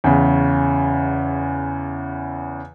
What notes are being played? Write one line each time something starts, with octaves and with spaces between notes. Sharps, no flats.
E2 C#3